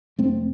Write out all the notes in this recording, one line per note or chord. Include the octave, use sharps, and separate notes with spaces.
F2 C3 A3 C4